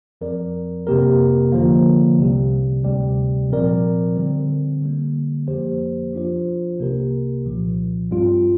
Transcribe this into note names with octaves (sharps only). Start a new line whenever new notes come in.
F2 F3 C4 A#4 D5
F2 C3 A#3 G4 A#4
D3 F3 A#3
C2 C3 G3
D2 C3 G3
A#2 F3 C4 A#4 D5
D3 G3 C4
D3 G3 A#3
F2 F3 A#3 G4 C5
F3 D4 F4 C5
C2 C3 A#3 G4 A#4
C2 A#2 F3
G2 G3 C4 F4